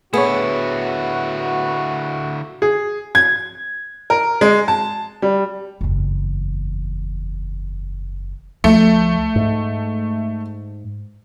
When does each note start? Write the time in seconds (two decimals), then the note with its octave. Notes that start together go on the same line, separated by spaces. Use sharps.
0.14 D3 B3 E4 F#4 G#4 C#5
2.62 G#4
3.15 G#6
4.10 A#4
4.41 G#3
4.68 A5
5.22 G3
5.81 F#1 E2
8.64 C#2 F3 A3
9.36 G#2